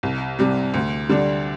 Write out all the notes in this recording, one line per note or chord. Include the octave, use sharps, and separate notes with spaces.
C2
C3 G3
D2
D3 G3 D4